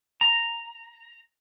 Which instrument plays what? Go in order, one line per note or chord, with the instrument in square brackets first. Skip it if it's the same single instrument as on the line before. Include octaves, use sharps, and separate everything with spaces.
[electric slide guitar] A#5